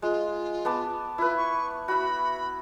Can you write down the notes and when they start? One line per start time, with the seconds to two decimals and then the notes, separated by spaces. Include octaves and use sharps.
0.02 G#3 F4
0.65 B3 A5 D6
1.18 E4 F4 B4
1.37 C#6
1.88 E4 F#4 B5